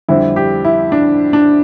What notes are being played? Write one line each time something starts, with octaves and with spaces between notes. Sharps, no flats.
F2 D3 G3 C4 E4
G4
E4
D4
D4